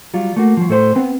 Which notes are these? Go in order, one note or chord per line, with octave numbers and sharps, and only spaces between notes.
F#3 G3 F4
A3 A#3 F#4
F3 F#3
A2 A4 C5 C6
B3 C4 B4